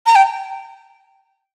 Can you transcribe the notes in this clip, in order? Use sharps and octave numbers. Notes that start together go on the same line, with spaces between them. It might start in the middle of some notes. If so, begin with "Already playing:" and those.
A#5
G5